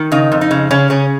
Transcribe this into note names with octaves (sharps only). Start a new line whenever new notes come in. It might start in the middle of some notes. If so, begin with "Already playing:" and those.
Already playing: D#3
C#3 D#4
F2
D#4
C#3
C#3 C#4
C#3 C#4